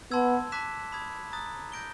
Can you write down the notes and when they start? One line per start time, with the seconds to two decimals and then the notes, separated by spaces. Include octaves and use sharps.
0.11 B3 A5 C6 E6 G#6
0.52 A5 D6 F#6 B6 E7
0.92 B5 D#6 G#6
1.32 A#5 D#6 F#6 A6
1.72 G6 A#6 D7 G7